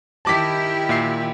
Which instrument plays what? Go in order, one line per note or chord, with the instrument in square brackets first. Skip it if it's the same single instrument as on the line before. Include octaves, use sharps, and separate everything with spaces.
[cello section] D#3 E4 G4 [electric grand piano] A5 D6 B6
[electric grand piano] A#2 E5 C7